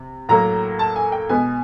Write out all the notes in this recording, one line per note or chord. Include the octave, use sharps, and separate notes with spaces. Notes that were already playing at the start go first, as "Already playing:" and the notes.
Already playing: C3
A2 F#3 A#3 A#5
A5
G#5
G5
B2 G#3 B3 G#5